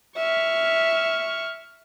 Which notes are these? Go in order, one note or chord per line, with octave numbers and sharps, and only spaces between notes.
E5 C#6 F6